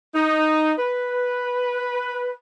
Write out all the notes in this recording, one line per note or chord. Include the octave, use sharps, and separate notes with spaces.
D#4
B4